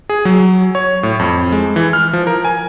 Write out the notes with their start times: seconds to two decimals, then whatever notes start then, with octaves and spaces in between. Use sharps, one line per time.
0.09 G#4
0.25 F#3
0.75 C#5
1.03 A2
1.19 F2
1.53 G#3
1.76 E3
1.93 F6
2.13 F3
2.27 A#4
2.45 G#5